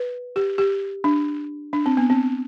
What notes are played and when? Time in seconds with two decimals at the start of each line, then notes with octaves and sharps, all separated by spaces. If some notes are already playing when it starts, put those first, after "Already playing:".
Already playing: B4
0.36 G4
0.58 G4
1.04 D4
1.73 D4
1.86 C4
1.97 B3
2.10 C4